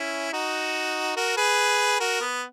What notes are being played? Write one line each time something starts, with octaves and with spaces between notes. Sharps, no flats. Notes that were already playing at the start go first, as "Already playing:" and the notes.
Already playing: C#4 E4
D#4 F#4
F#4 A#4
G#4 B4
F#4 A#4
B3